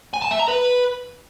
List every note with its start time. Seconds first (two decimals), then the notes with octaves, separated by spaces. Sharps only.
0.14 G#5
0.22 A5
0.31 E5
0.40 A#5
0.48 B4